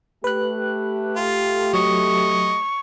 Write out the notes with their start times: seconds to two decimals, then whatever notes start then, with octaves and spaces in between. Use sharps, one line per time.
0.24 A3 G4 B4 F#6
1.16 F4
1.73 F#3 D#5 C#6